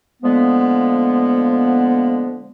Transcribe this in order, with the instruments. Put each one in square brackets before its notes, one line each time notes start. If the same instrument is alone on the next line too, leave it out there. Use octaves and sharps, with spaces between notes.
[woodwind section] D3 F3 G#3 A#3 B3